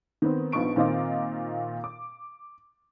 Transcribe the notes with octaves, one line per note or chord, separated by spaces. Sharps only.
D#3 B3 C4
A#1 F3 B3 D#4 C#6 D7
A#2 D#3 C4 F4 D#5 D6
D6